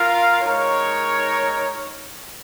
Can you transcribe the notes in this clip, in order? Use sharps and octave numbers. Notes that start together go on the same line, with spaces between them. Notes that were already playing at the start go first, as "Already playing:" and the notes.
Already playing: F4 A#4 F5
G#3 D#4 A#4 C#5